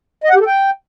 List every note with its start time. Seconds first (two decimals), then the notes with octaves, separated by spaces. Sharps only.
0.24 D#5
0.29 F#5
0.35 G4
0.41 A4
0.46 G5